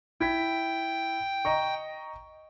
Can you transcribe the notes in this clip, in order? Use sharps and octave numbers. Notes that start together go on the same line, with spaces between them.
E4 G5 G#6 B6
D#5 A#5 C#6